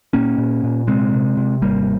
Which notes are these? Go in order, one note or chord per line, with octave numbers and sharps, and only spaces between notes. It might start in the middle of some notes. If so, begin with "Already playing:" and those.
A#2 A#3 C#4
A#2
A#2
C3 G#3 C4
C3
C3
G#1 G3 A#3